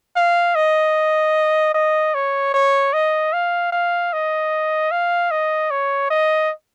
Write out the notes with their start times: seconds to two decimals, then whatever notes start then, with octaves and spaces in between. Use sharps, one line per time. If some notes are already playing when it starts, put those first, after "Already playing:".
0.16 F5
0.55 D#5
1.74 D#5
2.14 C#5
2.54 C#5
2.93 D#5
3.33 F5
3.72 F5
4.13 D#5
4.91 F5
5.31 D#5
5.71 C#5
6.10 D#5